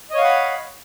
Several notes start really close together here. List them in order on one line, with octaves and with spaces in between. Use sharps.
D#5 C#5 F5 F#5 B5